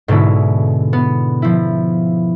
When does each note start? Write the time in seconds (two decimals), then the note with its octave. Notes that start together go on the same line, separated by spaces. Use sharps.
0.08 G#2 B2 D3 G#3 E4
0.93 B3
1.42 F3 E4